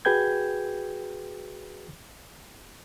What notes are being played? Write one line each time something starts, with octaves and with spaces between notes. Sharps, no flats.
F#4 G#4 B4 G5 G6 G#6